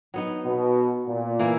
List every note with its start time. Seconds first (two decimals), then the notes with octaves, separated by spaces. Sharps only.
0.14 F#3 B3 D#4
0.44 B2
1.07 A#2
1.39 E3 A#3 E4